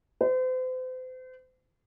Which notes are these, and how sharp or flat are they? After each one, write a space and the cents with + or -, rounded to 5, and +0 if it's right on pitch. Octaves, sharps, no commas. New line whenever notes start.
C5 -40